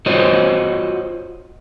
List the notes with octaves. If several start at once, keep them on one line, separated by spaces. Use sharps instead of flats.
F4 F#4 C5 C#5 D#5